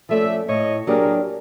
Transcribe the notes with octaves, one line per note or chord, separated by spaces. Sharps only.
F3 A3 C#4 D5 E5
A2 C#5 D#5
F#3 A#3 D4 G4 G#4 A#4